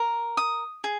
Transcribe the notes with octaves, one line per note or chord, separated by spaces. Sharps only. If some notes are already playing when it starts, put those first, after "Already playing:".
Already playing: A#4
D#6
G#4